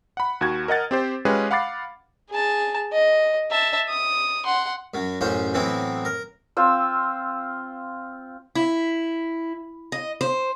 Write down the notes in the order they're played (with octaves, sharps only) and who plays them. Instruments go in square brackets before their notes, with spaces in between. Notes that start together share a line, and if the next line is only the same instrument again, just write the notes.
[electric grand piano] F#5 B5
D#2 F#4 G#6
A#4 D#5 F#5 A6
C4 G4 C5
G#3 C#4 F4 G4 G#4 B4
F5 F#5 B5 D6 A6 C7
[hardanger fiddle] G#4 A5
D#5
E5 A5
D#6
F#5 C6
[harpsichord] F#2 F#3
A1 F#2 C#4 C5 F#5
A2 E3 F#3 B3 C4 E4
A#4
[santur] C4 F4 E6
[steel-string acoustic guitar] E4
D#5
C5